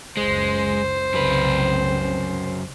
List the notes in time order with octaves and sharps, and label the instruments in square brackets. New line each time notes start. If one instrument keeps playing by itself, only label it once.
[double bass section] F#1 C#2 [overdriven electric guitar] G#3 [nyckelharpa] C5
[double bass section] C2 C#3 C4 [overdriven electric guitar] F#2 B4